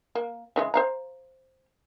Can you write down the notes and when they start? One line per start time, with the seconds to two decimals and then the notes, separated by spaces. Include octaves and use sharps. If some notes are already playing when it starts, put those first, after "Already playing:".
0.15 A#3
0.56 C#3 E3 G#3
0.74 C5 F5 A#5